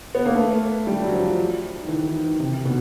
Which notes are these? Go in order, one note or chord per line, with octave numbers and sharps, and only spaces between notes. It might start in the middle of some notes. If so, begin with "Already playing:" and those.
B3
A#3
A3
G3
F#3
F3
D#3
E3
D#3
C3
B2